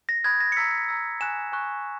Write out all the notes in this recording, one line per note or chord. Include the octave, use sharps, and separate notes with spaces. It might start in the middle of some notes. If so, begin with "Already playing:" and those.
A#6
B5 D#6 F#6 G#6
A#6
C#7
A#5 E6 B6
A#5 E6
G#5 C#6 F#6 E7
G#5 C#6 F#6